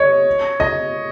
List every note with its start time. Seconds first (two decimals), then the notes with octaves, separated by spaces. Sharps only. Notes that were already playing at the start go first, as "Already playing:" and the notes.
Already playing: C#5 D#5
0.60 D#5